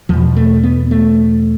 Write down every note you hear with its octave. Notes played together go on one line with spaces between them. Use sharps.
E2 B2 F3
A3
B3
A3